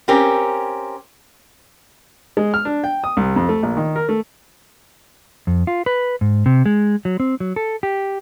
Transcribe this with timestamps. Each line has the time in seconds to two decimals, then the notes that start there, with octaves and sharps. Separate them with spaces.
0.08 C4 C#4 G4 A#4
2.37 G#3
2.54 F6
2.65 D4
2.84 G5
3.04 D#6
3.17 C2
3.36 F2
3.49 A3
3.63 A#1
3.77 D#3
3.96 A#4
4.09 A3
5.47 F2
5.67 F4
5.86 B4
6.21 G#2
6.46 C3
6.66 G#3
7.05 F#3
7.20 C4
7.40 F#3
7.56 A4
7.83 G4